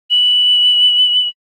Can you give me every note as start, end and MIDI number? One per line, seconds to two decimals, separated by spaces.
0.11 1.28 102